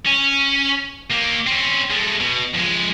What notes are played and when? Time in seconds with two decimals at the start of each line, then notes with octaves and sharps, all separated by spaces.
0.06 C#4
1.11 A#3 G4
1.47 C4 C#4
1.91 G#3 A3
2.20 B2
2.54 F2 G#3